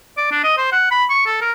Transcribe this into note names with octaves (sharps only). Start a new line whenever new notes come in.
D5
D4
D#5
C5
F#5
B5
C#6
A4
A#4